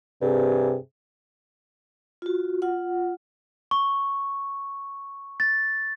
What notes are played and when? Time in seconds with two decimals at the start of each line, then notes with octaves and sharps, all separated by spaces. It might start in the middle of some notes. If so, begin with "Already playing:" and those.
0.22 G2 C3 G#4
2.22 F4 F#4
2.62 F4 F#5
3.71 C#6
5.40 A6